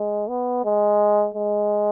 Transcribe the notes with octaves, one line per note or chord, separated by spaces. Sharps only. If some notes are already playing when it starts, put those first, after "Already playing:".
Already playing: G#3
B3
G#3
G#3